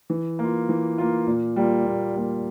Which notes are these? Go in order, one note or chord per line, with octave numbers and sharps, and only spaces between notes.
E3
A#3 F4
E3
A#3 F4
A#2
G3 A#3 F4
A#2
G3 A#3 F4